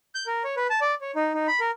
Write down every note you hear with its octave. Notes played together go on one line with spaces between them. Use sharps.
G6
A#4
C#5
B4
A5
D5
C#5
D#4
D#4
B5
A#4